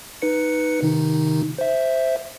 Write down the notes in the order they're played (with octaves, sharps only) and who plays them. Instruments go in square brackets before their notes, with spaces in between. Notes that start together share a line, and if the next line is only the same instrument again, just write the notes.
[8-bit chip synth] D#4 B4 C#7
C3 D#3 D#4
C5 E5